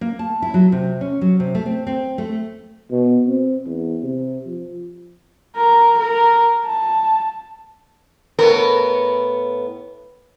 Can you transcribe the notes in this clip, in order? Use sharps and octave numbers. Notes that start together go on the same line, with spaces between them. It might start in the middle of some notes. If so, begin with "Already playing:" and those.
A#3
A5
E4
F#3
C3
C#4
F#3
C3
A3
C4
C4
A3
B2
C4
E2
C3
F3
A#4
A#4
A5
A2 B3 A#4